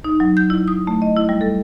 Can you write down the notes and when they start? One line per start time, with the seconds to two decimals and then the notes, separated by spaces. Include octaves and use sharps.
0.04 D#4
0.20 F#3
0.37 G6
0.50 E4
0.68 D#6
0.87 A3
1.02 D#5
1.16 E4
1.29 G3
1.41 A4